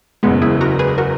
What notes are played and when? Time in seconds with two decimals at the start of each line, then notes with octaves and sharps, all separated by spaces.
0.23 F#1 E2 C#3 G#3 B3
0.42 E4 G#4
0.61 F#4 A#4
0.79 G#4 B4
0.98 F#4 A#4